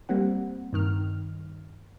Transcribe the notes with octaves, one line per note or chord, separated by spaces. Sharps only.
G3 A#3 C4 F#5
G2 D#3 F6